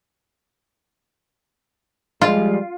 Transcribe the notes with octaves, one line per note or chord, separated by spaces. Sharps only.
F3 G3 G#3 F4